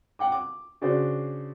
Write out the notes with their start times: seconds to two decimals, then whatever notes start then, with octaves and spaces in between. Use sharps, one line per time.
0.19 F#5 G5 D6
0.32 D6
0.82 C#3 D4 F#4 C5